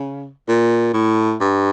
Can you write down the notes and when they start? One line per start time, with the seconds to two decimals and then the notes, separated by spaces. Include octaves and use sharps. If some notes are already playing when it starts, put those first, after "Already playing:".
Already playing: C#3
0.48 A#2
0.94 A2
1.41 G2